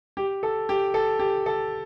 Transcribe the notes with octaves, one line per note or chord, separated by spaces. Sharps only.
G4
A4
G4
A4
G4
A4